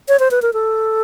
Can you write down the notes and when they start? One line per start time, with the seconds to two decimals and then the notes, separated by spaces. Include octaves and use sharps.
0.09 C#5
0.20 C5
0.31 B4
0.42 A#4
0.53 A4